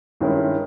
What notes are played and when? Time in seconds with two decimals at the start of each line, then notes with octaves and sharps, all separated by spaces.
0.21 G2 D#3 G#3 C#4 E4